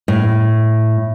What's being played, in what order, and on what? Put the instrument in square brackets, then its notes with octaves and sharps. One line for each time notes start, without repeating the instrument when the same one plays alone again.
[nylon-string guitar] A2